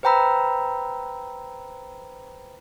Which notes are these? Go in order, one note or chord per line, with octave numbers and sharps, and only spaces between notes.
B4 C5 G5 A#5 B5 E6